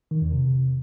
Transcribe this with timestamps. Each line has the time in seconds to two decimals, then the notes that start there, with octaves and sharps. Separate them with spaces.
0.11 D#3
0.22 E2
0.32 C3